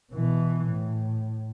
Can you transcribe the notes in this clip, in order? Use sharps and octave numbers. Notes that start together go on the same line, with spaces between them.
B2 E3
A2